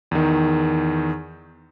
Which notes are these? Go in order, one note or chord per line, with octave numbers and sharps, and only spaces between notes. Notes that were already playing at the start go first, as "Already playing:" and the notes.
E2 D#3